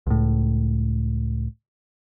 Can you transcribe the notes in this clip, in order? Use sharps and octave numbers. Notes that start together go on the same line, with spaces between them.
C#2 A2